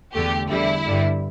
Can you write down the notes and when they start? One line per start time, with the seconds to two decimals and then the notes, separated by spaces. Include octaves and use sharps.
0.14 E2 D3 A3 G4
0.49 E2 D3 G3 E4
0.86 G1 G2 D3 G3